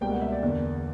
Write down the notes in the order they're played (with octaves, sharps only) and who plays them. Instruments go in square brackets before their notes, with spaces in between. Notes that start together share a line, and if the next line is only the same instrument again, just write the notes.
[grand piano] C#2 B2 G3 A#3 G5
F#5
E5
D5
E2 D3 A#3